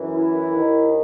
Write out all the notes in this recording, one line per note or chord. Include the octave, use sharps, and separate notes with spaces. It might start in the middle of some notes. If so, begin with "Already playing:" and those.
Already playing: F#2 E3
E4
D#2 D#3